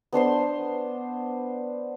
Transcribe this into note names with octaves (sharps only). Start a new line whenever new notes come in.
B3 D4 C5 C6